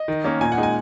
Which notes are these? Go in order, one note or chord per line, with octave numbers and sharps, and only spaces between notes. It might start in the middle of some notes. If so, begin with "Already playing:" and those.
Already playing: D#5
D#3
A#3 C#4
A#2 G#5
F#5
G#3 D#4
G#5